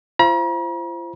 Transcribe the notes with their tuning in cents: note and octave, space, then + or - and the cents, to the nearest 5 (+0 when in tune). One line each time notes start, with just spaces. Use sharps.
F4 -40 C5 +5 A#5 +45